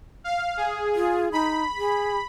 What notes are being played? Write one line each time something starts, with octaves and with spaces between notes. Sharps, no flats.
F5
G#4
F4
D#4 B5
G#4